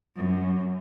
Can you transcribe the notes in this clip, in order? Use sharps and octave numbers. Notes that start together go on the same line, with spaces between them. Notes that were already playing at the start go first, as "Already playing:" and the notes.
F#2